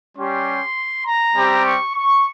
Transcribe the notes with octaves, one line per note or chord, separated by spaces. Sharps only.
G3 C#4 G4 C6
A#5
G3 C4 G4
C#6
C#6